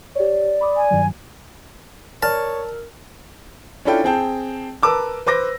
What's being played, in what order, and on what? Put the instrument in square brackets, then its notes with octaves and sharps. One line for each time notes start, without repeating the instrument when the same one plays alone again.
[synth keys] G4 C#5 [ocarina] D5
[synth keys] B5 D6 D#6
[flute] G#5
[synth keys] G2 D#3 F#3
[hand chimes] A#4 [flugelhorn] C#5 [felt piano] D5 F6 [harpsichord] A5
[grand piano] C#4 D4 E4 F4 A4 G5
C4 G#4 G5 A5
A#4 B4 A5 D6 E6
B4 C5 D6 A#6